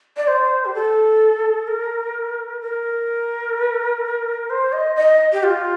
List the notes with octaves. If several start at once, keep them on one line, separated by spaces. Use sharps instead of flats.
D5
C5
G4
A4
A#4
A#4
C5
D#5
D#5
G4
F4